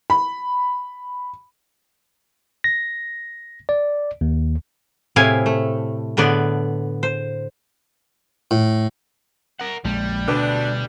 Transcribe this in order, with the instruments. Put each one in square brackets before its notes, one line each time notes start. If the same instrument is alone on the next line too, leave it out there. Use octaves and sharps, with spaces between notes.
[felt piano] B5
[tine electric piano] A#6
D5
D#2
[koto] A2 C3 E4 F5 G#5
A3
A2 D3 B3 B4 D5
C5
[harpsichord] A2
[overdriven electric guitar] A#4 F#5
[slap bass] A#1 G#3 [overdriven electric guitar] G3
[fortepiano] D2 B4 D6 [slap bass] B2 [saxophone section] D4